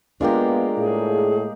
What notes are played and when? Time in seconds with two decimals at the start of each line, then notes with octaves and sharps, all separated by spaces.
0.21 G#3 A#3 B3 D4 F4 G4 A#4
0.78 A2 G#4